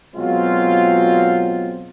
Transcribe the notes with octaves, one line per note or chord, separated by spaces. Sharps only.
B2 F#3 G#3 C4 F4